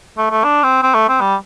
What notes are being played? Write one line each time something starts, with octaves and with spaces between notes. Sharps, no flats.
A3
A3
D4
C4
C4
A3
C4
G3